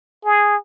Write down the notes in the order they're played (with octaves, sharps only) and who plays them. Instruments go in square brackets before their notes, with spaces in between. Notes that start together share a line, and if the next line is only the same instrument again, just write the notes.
[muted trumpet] G#4